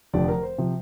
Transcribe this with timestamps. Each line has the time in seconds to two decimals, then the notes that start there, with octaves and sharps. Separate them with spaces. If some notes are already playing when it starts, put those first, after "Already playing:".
0.13 F1 F2 D3 F3 D5
0.28 A#4
0.43 C5
0.58 C3 F3